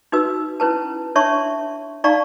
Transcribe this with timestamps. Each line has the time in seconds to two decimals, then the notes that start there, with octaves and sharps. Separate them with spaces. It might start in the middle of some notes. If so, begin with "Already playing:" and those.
0.12 D#4 F#4 B4 E6
0.60 C#4 E4 B4 A5
1.15 D4 C#5 E5 A5 C6 C#6
2.04 D#4 D5 F5 A5 A#5 C#6